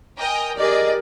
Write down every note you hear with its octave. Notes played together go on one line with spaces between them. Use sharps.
A#4 D#5 G5 G#5
G4 G#4 A#4 D5 D#5